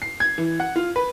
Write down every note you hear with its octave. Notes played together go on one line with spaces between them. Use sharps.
C7
G#6
E3
F#5
F4
B4